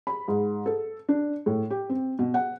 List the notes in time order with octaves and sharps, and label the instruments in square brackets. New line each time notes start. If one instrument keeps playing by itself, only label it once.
[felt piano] B5
G#2
A4
D4
A2
G4
C4
B2
F#5